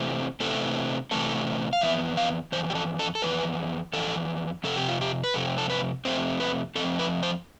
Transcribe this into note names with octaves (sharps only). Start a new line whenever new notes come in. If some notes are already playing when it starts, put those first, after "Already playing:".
Already playing: C3 E3 A3 C4
C3 E3 A3 C4 A4
C3 E3 A3 C4 A4
F5
F2 E3 B3 E5
F5
F2 E3 C5
G4
A4
A4
A4
F2 E3 B3 B4
F2 E3 A4
F2 C3 A4
G4
F4
G4
B4
F2 C3 C4 A4
A4
B4
F2 C3 F3 A3 C4 C5
B4
F2 C3 F3 A3 C4 A4
B4
C5